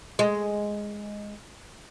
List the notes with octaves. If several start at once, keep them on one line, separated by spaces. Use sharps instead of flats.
G#3